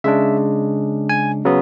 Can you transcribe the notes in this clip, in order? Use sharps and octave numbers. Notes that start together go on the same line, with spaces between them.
C#3 G#3 D4 E5
G#5
C#3 F#3 B3